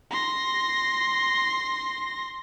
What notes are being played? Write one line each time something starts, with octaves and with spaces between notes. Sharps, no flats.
C6 A#6